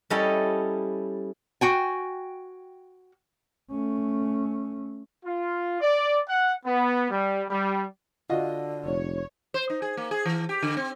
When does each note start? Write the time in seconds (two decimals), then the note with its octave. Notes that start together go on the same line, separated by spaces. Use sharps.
0.10 G3 C#4 E4 A4 D#5
1.61 F#4 G5 G#5
3.70 A3 C#4
5.24 F4
5.81 D5
6.28 F#5
6.65 B3
7.10 G3
7.50 G3
8.30 D3 F4 F#4 D#5
8.85 F1 C#5
9.54 C5
9.70 D#4
9.82 G#4
9.97 A#3
10.11 G#4
10.25 E3
10.49 G4
10.62 D3
10.77 C4